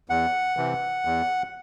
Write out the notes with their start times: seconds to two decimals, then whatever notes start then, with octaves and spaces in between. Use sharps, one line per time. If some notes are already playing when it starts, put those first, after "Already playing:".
0.09 E2 F#5
0.57 C3 E3
1.05 E2